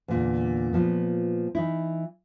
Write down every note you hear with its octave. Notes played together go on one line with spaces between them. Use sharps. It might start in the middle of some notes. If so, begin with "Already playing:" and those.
E2 A#2 D3
A#2 F3 B3
E3 D#4 E4